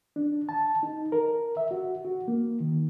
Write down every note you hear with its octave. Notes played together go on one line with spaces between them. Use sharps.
D4
A5
D#4
A#4
E5
F#4
F#4
A#3
D#3